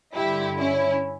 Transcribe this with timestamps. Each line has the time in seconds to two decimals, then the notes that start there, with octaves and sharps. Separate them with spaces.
0.15 G2 D3 E4 G4
0.59 C#4 E4